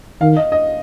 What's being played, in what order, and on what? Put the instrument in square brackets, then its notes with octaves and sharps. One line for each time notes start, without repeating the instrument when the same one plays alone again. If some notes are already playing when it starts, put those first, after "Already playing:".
[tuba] D#3 [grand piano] F5
[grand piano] D#5
D#5